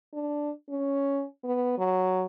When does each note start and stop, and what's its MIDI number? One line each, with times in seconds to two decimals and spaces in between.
0.13 0.50 62
0.69 1.25 61
1.44 1.75 59
1.78 2.25 54